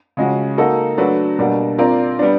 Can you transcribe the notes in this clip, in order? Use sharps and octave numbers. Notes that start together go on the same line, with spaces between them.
C#3 F3 G#3 C#4 F#4
A#3 D#4 F#4 A4
F#3 A3 D4 F#4 B4
B2 G3 A#3 D4 F#4
C4 F4 A#4 D5
G3 B3 D4